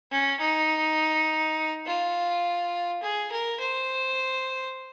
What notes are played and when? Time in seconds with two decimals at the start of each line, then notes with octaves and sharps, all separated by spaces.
0.11 C#4
0.40 D#4
1.86 F4
3.03 G#4
3.31 A#4
3.60 C5